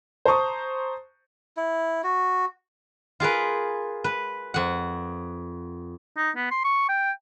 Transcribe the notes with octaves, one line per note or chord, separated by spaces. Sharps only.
C5 A5 A#5 C#6 D#6
E4
F#4
F4 G#4 A#4 B4
B4
F2 F#5
D#4
B3
C6
C#6
G5